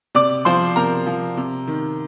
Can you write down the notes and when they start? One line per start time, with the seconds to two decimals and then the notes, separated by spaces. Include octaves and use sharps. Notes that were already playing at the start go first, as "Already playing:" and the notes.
0.15 C3 D5 D6
0.45 F3 C5 C6
0.76 C3 A#4 A#5
1.06 F3
1.37 C3
1.67 D#3